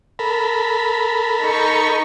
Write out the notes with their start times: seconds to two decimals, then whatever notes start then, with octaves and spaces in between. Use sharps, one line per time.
0.19 A4 A#4 B5
1.44 D#4 C#6